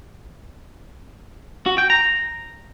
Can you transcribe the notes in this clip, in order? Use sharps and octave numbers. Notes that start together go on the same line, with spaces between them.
F#4
G5
A#5